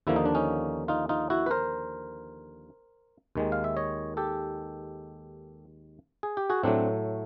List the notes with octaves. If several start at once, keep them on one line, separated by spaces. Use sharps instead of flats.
D#2 D3 F3 A#3 E4
D#4
D4
C#4 D#4
D#4 F4
D#4 F4
E4 F#4
B4
A#4 C5
D#2 D#3 G#3
F5
E5
C#5 D#5
G4 A4
G#4
G4
F#4 G#4
A2 F#3 A3 C4 D4